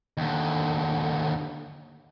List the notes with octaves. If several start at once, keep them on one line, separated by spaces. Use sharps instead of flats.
D#2 D3